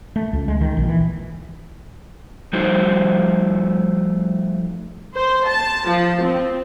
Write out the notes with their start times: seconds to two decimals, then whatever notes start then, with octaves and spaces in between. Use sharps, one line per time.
0.16 A3
0.33 C#2
0.48 G#3
0.61 D#3
0.77 A#1
0.88 E3
2.53 F3 G3 A3 D#4 F#4 C5
5.15 C5
5.46 A5
5.86 F3
6.20 C4